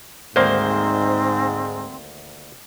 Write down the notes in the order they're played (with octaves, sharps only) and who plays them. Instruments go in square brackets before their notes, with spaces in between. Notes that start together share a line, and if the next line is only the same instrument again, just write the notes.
[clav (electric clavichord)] D2 D#3 A#3 [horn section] G#2 [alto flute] C4 [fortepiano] C5